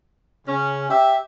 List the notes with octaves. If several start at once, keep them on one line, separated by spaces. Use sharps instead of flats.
C#3 C#4
G4 E5